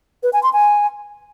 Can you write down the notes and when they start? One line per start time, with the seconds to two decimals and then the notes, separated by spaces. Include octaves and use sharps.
0.23 B4
0.33 G#5
0.43 C6
0.53 G#5